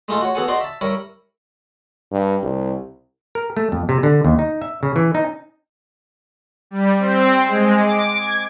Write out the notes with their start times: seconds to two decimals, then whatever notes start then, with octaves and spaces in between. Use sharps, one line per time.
0.08 G#3 A3 D#4 F4 A4
0.21 F#4 C#5
0.35 B3 F#4 G#4 A4 F#5 G#5
0.48 D#4 F#4 D5 C6
0.61 E5 A5
0.81 G3 E4 A#4 C#5
2.11 G2
2.43 C2
3.35 A#4
3.57 A3
3.72 F2
3.89 C3
4.03 D3
4.25 D#2
4.39 D#4
4.61 E5
4.83 C#3
4.96 E3
5.15 D#4
6.71 G3
6.99 C4
7.48 G#3
7.79 D6
8.17 G#6